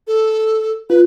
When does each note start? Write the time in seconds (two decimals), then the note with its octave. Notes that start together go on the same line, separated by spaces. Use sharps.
0.07 A4
0.90 F4 B4